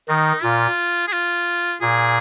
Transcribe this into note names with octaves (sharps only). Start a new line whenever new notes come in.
D#3 D#4
A#2 F4
G#4
F4
A#2 G#4